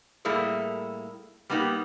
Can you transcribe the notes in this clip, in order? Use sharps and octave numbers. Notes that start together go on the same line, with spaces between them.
A2 G3 A#3 E4 G#4 A4
G3 A#3 B3 D#4 G4